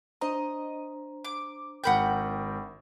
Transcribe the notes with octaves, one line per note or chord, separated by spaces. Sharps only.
D4 C5 D#5 A#5
D6
G#1 A#4 F#5 G5 B5 G6